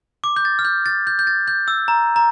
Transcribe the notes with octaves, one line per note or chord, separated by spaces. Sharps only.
D6
G6
A6
F6
G6
A6
G6
G6
A6
G6
E6
A#5
A#5